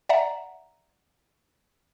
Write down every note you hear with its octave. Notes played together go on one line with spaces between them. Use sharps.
D5 E5 F#5 A#5